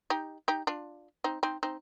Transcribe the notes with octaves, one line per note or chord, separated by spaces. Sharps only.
D#4 G4
D#4 G4
D4 F4
C4 D#4
C4 D#4
C4 D#4